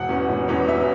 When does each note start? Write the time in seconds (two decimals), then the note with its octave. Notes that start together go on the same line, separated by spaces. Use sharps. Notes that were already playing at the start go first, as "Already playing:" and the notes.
Already playing: E1 F#5
0.09 E2 E3 C#4
0.29 E1
0.48 E2 E3 C#4
0.68 E1 E5